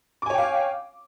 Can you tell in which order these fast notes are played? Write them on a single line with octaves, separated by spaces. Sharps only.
D6 G#5 C#5 G5 F5